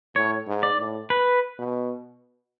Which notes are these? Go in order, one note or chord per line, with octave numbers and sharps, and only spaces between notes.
A2 C#5
G#2
D5
A2
B4
B2